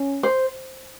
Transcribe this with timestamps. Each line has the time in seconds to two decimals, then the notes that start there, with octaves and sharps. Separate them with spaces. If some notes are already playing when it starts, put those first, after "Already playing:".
Already playing: C#4
0.23 C5